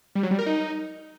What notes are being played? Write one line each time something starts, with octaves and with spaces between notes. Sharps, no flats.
G3
F#3
G3
A#4
D#4